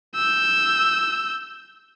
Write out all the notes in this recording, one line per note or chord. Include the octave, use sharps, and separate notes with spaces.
E6 G6